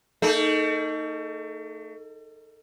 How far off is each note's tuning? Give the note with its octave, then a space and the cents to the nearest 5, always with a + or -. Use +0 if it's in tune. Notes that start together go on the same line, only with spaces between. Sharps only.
A3 +40 D#4 +0 A4 -35